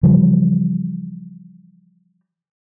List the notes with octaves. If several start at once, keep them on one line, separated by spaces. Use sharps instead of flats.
C#3 E3 F3 G3